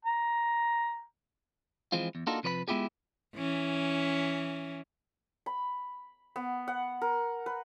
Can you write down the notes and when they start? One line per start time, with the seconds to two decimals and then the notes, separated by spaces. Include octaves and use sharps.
0.05 A#5
1.92 E3 F3 G#3 C4 F4
2.15 E2
2.27 A#3 D4 D#4 F4 F#4 A4
2.43 C3 F3 B4 C#5 B5
2.68 G#3 B3 E4 F4 G4 G#4
3.36 E3 C#4
5.46 B5
6.36 B3
6.68 F#5
7.02 A#4
7.46 B4